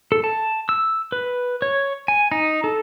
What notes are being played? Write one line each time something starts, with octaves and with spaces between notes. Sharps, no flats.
A4
A5
E6
B4
C#5
G#5
D#4
A4